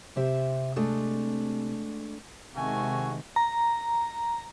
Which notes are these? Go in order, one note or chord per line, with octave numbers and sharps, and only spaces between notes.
C3 G4 C5 E5
G#3 A3 D4
C3 D#3 G#3 A3 F#4 G#5
A#5